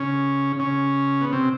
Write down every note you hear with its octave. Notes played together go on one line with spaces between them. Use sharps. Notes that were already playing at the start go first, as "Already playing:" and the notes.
Already playing: C#3 C#4
C#3 C#4
B3
C3 C4